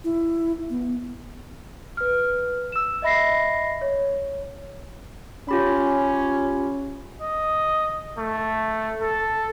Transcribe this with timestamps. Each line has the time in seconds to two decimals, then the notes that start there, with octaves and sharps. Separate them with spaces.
0.04 E4
0.70 B3
1.97 B4 F6
2.72 E6 E7
3.02 D#5 E5 B5 A#6 C7
3.81 C#5
5.49 C#4 F4 G4 B5
7.21 D#5
8.18 A3
9.01 A4